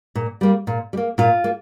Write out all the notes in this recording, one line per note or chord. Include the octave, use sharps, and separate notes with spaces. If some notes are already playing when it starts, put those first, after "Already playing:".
A#2
G3 A#3
A#2
G3
A#3
A#2 F4
A#3